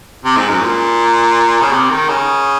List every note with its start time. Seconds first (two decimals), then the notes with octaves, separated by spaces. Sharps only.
0.25 C3
0.37 G#2
0.49 F#2
0.61 A#2
1.61 C#3
1.72 C3
1.91 D#3
2.09 C#3